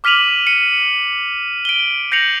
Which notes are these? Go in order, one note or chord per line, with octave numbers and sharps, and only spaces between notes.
D6 F6 B6 D#7 F7 F#7
C#7 D#7
D7 G7
G6 A#6 C7 C#7 F7 F#7